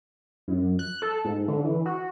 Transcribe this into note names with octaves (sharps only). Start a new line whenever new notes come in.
F#2
F#6
A4
G#2
D3
E3
F#4